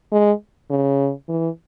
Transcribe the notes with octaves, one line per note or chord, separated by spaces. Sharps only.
G#3
C#3
E3